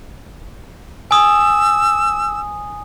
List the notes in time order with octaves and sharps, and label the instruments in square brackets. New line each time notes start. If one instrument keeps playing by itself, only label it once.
[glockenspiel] G#5 D#6 [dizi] E6